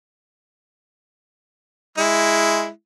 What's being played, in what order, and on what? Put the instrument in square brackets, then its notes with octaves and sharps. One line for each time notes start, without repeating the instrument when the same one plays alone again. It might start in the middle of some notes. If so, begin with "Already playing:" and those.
[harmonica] G#3 E4